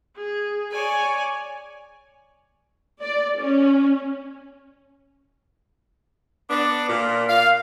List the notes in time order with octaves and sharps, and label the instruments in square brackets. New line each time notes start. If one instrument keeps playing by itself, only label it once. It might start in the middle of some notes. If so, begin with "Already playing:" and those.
[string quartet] G#4
C#5 D5 G#5
[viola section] D5
C#4
[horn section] B3 D4
A#2
F5